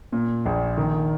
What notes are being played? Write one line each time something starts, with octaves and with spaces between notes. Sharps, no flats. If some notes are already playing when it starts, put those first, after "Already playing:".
A#2
A#1
D#3